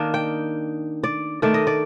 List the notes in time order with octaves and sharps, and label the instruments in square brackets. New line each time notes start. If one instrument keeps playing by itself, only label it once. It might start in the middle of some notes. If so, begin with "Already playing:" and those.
Already playing: [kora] D#3 A#3 D4 D#5
G5
D5
D#3 A3 D4 D5
D#5
D5